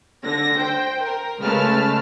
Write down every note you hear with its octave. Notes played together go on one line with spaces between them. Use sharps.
D3 A#6
C5 G5
A#4
C#3 G#3 A3 B4 A5 F6